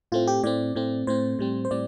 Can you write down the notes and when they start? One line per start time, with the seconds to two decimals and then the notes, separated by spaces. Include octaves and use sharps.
0.12 A2 A3 C4 F4
0.27 G4
0.43 A2 A3 C4 D5
0.76 A2 A3 C4
1.07 A2 A3 C4 C5
1.39 A2 G3 C4
1.65 C5
1.71 A2 G3 C4 D5